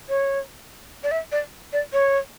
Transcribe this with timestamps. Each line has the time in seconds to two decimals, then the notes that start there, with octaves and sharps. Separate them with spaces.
0.09 C#5
1.03 D5
1.11 E5
1.32 D5
1.73 D5
1.93 C#5